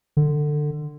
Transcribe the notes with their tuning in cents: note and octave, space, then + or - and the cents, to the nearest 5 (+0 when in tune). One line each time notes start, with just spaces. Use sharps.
D3 +20